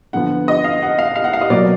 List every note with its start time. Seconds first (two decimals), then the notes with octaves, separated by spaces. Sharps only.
0.13 D3 F3 B3 F#5
0.48 D#5
0.64 F5
0.82 F#5
0.99 F5
1.16 F5
1.24 F#5
1.33 F5
1.41 D#5
1.50 B2 F#3 A#3 D5